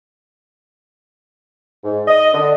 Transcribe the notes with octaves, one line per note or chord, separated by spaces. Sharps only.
G#2
D#5
D3